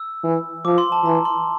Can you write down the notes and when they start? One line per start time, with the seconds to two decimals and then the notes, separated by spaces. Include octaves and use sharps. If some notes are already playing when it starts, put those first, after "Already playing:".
Already playing: E6
0.24 E3
0.65 F3 D6
0.78 C6
0.92 A5
1.05 E3 A#5
1.25 C6